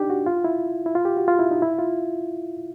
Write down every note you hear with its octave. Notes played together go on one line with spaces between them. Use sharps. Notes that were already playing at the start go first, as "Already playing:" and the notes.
Already playing: D4 D#4 G4
F#4
F4
E4
E4
F4
G4
F#4
F4
E4
D#4
E4
F4